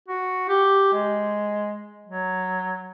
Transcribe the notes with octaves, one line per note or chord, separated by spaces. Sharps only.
F#4
G4
G#3
F#3